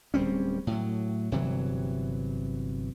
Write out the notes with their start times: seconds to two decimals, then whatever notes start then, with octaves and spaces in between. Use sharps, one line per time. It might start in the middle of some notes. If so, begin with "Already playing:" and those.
0.14 D1 G3 C4 C#4
0.67 A2 F#3
1.32 G1 C3 E3 F#3